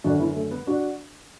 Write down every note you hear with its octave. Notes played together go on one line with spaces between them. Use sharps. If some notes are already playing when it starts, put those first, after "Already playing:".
F#2 D3 D4 F#4
B3 E4
A3
B3
D4 F#4